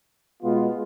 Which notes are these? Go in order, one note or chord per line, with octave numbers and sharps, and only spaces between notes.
B2 G#3 B3 F4